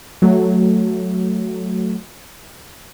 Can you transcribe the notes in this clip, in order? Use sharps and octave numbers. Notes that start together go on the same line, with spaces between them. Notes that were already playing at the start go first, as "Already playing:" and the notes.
F#3 A3